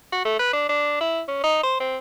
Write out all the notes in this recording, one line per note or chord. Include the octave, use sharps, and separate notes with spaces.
F#4
A3
B4
D4
D4
E4
C#4
D#4
C5
C4